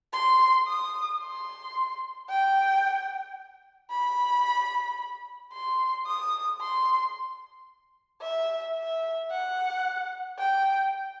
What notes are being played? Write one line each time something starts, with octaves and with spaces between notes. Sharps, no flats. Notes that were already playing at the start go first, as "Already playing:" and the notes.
C6
D#6
C6
G5
B5
C6
D#6
C6
E5
E5
F#5
G5